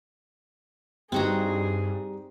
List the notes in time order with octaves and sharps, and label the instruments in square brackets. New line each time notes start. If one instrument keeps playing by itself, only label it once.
[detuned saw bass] G2 [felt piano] G3 D#4 [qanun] C4 F#4 A#5 [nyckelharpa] G#4